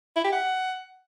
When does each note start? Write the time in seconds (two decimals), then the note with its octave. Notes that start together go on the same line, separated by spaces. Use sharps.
0.16 E4
0.24 G4
0.32 F#5